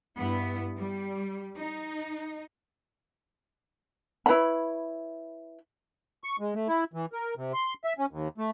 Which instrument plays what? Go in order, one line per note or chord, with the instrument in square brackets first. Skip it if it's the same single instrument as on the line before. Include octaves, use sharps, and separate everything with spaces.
[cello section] G2 B3 E4
G3
D#4
[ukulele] E4 B4 C#5 B5
[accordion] C#6
G#3
A3
E4
E3
A#4
C3
C6
E5
C#4
D#2
A3